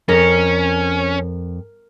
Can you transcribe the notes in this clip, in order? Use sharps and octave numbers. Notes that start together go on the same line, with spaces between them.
F2 C#4 A#4